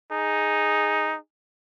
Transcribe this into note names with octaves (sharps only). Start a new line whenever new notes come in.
D#4 G#4